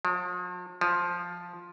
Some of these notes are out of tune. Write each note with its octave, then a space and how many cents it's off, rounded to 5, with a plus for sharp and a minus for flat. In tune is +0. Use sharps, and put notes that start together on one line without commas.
F3 +45
F3 +5